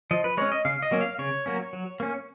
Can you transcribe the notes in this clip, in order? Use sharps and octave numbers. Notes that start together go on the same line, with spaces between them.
F3 D#5
B4
G#3 C#4 C#5
D#5
C#3 F5
D#5
F#3 A#3 C#4
F5
C#3 C#5
F#3 A#3 C#4
F#3
A#3 C#4